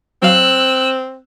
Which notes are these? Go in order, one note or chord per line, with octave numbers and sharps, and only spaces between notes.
F#3 C4 F5 E6 F#6